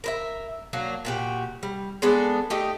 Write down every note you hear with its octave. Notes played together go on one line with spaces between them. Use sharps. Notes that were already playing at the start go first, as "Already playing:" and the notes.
A#4 B4 E5
F#3 A#3 D4
A#2 F#4 G4
G3
G#3 B3 D4 A4
A3 D#4 G4 D#5